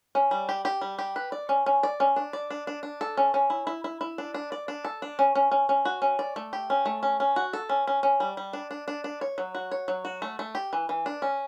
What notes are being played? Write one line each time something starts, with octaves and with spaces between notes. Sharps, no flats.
C#4
G3
G4
G4
G3
G4
B4
D5
C#4
C#4
D5
C#4
D4
D5
D4
D4
D4
A4
C#4
C#4
E4
E4
E4
E4
D4
D4
D5
D4
A4
D4
C#4
C#4
C#4
C#4
F#4
C#4
D5
A3
G4
C#4
A3
C#4
C#4
F#4
A4
C#4
C#4
C#4
G3
G3
D4
D4
D4
D4
C#5
F#3
F#4
C#5
F#3
F#4
A3
A3
G4
E3
E3
D4
C#4